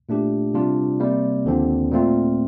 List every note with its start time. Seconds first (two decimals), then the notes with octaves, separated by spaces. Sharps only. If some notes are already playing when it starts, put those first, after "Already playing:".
0.09 A#2 A3 D4 G4
0.54 C3 G3 D4 F4
1.00 C3 G3 A#3
1.45 D#2 D3 F3 C4
1.91 A#2 A3 C4 F4